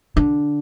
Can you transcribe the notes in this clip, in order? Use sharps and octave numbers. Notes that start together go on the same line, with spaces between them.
D3